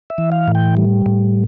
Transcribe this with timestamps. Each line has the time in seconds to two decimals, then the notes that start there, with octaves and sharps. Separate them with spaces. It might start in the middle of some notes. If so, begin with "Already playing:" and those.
0.10 E5
0.18 E3
0.32 F5
0.48 A2
0.55 G5
0.77 G3
1.06 A2